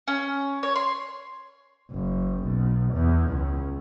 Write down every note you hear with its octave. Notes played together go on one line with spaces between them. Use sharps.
C#4
C#5
C6
F#1
B1
E2
C#2